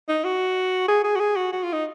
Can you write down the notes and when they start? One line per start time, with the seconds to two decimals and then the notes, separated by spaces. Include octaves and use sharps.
0.08 D#4
0.24 F#4
0.88 G#4
1.04 G#4
1.16 F#4
1.20 G#4
1.36 F#4
1.52 F#4
1.63 F4
1.73 D#4